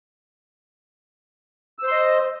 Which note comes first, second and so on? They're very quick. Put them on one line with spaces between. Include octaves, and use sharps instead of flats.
E6 C5 C6 D#5